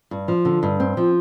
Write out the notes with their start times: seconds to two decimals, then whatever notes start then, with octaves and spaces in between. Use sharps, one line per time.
0.11 G2
0.28 F3
0.45 D3
0.63 G2
0.80 C4
0.97 F3